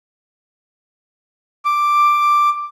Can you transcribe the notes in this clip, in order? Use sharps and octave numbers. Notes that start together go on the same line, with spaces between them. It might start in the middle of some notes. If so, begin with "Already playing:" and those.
D6